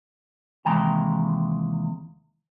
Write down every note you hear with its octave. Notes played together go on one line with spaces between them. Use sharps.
D#2 C3 E3 G#3 G5 A#5